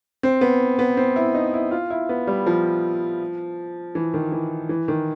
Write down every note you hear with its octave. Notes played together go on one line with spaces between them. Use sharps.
C4
B3
B3
C4
E4
D#4
E4
F4
E4
B3
G3
F3
E3
D#3
E3
E3
D#3